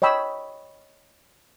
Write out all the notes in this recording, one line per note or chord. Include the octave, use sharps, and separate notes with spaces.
C#5 D#5 G5 B5 E6